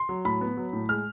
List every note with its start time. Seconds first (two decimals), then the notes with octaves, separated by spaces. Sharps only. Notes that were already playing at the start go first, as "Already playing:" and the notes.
Already playing: C6
0.09 F#3
0.25 A2 B5
0.41 B3
0.57 F#3
0.73 A2
0.89 G#3 F6